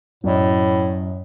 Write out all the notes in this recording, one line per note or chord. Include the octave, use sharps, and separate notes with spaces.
F#2 A2 D5 D#5